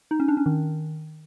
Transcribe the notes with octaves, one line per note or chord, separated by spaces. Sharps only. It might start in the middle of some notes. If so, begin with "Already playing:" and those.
D#4
C#4
D4
C#4
D#3